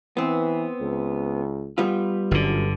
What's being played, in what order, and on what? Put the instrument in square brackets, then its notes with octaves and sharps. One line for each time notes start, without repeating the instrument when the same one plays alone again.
[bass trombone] E3 [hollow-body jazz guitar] B3 C4
[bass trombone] C#2
[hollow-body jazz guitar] G3 B3 F4
[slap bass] G1 D3 [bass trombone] F#2